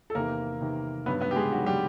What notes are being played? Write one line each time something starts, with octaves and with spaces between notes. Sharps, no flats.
A4
E2 C3 D#3 A#3 A#4
E2 C3 D#3
G2 D#3 F#3 B3 B4
B3 B4
G4
G#3 G#4
G2 D#3 F#3 F#4
G3 G4